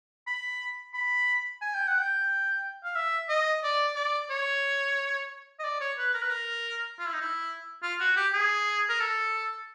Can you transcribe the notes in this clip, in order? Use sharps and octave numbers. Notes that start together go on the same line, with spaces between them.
B5
B5
G#5
G5
F#5
G5
F5
E5
D#5
D5
D5
C#5
D#5
D5
C#5
B4
A#4
B4
A#4
F4
E4
D#4
E4
F4
F#4
G4
G#4
A#4
A4